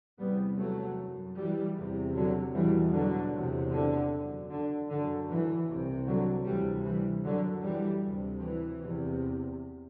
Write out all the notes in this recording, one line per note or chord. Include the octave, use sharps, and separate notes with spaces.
E2 C3 G3 B3
F#3 A3
F#2
E3 G3
E2 C3
D3 F#3
E2 B2 E3 G3
D3 F#3
E2 C3
D3
F#2
D3
F#2 D3
E3
C2 C3
D3 F#3
D2 C3 E3 G3
E3 G3
F#2 D3 F#3
E3 G3
D2 C3
E3
E2 C3